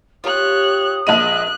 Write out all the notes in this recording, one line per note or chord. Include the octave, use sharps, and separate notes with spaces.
F4 G4 C#5 D#6 F#6
A#1 G#3 D#5 F#6 D#7